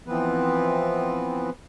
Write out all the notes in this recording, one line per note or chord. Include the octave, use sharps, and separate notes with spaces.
E3 F3 B3 C4 B4